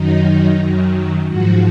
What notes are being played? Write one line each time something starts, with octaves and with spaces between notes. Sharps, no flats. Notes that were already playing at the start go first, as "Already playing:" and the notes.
Already playing: F#2 D#3 F#3 D#4
F#2 D#3 F#3
G#2 F3 F#4